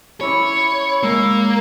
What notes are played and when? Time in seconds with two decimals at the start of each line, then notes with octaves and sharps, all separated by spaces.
0.21 C#4 E4 C#5 B5 D6
1.03 G#3 A#3 E6